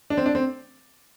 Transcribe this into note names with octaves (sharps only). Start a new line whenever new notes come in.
D4
C4
D4
C4